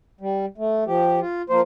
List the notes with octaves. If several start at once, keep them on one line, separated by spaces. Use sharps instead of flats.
G3
A3
F3 G4
F4
F3 A#3 C5